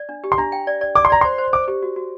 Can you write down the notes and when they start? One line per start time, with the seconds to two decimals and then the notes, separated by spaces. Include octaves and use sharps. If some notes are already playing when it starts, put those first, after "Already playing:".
Already playing: D5
0.09 D4
0.24 G4
0.32 C6
0.38 D4 A#5
0.52 G5
0.67 D5
0.81 D5
0.95 D5 D6
1.05 C6
1.10 D5 A#5
1.21 C5 C6
1.38 C5
1.53 C5 D6
1.68 G4
1.82 F#4
1.96 F#4